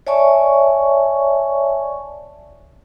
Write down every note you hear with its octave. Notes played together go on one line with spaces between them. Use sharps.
C#5 D5 E5 G#5 A5 C#6